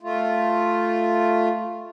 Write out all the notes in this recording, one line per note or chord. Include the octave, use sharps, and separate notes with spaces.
A3 F4